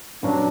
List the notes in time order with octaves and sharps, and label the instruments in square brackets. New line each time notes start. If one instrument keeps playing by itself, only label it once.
[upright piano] G2 F#3 C#4 F#4 [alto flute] D4